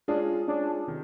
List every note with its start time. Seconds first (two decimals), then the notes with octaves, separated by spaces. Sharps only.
0.08 G#3 C#4 D4 F4 G#4
0.47 G#3 C#4 D4 F4 G#4
0.87 C3 D#3